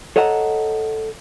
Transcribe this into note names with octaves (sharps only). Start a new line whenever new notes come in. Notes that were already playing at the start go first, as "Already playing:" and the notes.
A4 C#5 D#5 F#5 A5 A#5